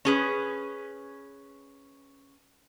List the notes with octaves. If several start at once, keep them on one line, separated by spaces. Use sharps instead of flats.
C#4 G#4 B4